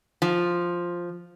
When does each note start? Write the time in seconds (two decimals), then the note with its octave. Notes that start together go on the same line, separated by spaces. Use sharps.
0.22 F3